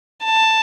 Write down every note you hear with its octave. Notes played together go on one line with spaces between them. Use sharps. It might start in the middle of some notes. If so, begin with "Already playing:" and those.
A5